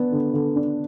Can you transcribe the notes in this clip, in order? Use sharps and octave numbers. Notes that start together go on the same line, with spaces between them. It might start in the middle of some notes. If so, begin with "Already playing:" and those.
Already playing: B3 D4
D3
D3
D4